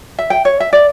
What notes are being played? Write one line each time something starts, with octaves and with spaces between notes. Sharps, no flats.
E5
G5
C#5
E5
D5